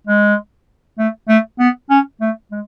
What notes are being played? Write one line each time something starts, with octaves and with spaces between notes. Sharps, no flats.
G#3
A3
A3
B3
C#4
A3
G#3